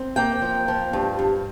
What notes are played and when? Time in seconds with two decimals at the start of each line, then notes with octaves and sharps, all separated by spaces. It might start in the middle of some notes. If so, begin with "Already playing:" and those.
Already playing: C4
0.16 A#3 G5
0.42 F3
0.68 F3
0.93 G2
1.19 G2